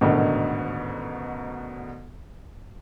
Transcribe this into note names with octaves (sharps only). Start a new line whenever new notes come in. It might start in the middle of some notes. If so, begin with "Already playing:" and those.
A1 D2 G#2 B2 D3 D#3